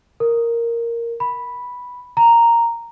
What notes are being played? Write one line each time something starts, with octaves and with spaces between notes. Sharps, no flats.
A#4
B5
A#5